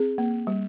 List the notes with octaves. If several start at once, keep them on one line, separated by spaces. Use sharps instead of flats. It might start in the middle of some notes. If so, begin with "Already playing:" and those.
Already playing: C4 G#4
A#3
G3